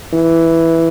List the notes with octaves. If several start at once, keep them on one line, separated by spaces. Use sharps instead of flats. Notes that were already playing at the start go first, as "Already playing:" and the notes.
E3